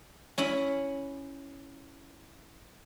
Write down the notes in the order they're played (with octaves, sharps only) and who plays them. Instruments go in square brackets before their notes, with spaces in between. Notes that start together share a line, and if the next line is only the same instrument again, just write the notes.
[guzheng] C#4 E4 B5